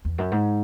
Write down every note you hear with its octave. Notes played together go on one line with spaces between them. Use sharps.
E2
F#2
G#2